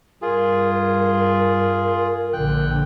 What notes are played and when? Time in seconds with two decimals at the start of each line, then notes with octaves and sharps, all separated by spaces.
0.22 G2 F4 G#4 A#4
2.33 A#1 D3 G5 F#6